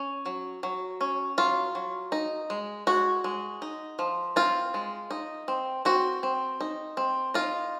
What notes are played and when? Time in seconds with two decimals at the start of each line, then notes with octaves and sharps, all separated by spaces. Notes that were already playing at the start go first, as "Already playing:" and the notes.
Already playing: C#4
0.26 F#3
0.63 F#3
1.01 C#4
1.38 F#3 F4
1.75 F#3
2.12 D#4
2.50 G#3
2.87 G#3 F#4
3.24 G#3
3.62 D#4
3.99 F3
4.36 C4 F4
4.74 G#3
5.11 D#4
5.48 C4
5.85 C4 F#4
6.23 C4
6.61 D#4
6.97 C4
7.34 D#4 F4